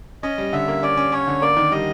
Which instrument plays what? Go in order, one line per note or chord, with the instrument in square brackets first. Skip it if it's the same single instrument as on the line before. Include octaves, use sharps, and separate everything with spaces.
[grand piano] C#4 [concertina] D#5
[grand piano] G3
[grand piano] D3 [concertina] E5
[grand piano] A#3
[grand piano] C#4 [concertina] D5
[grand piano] C#4
[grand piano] C#4 [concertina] C#5
[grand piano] D3
[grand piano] A#3 [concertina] D5
[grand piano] D#3
[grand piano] G3 [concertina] D#5